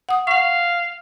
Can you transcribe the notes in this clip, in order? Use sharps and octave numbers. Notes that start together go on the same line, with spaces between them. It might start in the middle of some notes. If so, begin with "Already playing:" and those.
F#5 D#6
F5 F#5 C#6